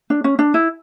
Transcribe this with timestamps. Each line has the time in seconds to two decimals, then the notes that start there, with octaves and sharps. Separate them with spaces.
0.10 D4
0.24 C#4
0.39 D4
0.54 E4